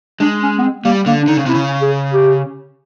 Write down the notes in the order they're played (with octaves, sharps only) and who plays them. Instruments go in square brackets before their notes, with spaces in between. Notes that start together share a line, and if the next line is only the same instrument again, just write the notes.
[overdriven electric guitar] G#3 [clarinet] D4
[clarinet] C#4
B3
C4
[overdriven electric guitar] G3 [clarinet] A#3
[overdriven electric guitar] D3 [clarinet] A#3
[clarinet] D4
[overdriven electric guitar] D3 [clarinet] D#4
[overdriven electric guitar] C#3
[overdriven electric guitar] C3 [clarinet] E4
[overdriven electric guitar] C#3
[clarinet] G#4
G4